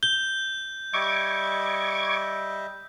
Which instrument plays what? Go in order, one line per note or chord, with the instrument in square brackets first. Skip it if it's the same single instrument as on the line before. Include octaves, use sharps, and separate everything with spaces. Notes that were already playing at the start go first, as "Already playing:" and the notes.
[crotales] G6 [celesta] G7
[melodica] G3 D#5 E5 [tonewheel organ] C#6 D6 G#6